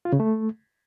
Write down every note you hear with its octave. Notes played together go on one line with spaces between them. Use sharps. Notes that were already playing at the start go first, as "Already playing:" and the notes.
F4
C#3
A3